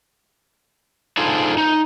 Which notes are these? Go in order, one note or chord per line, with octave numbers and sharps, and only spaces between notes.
D4 D#4 F4 G#4 A4 C5
D#4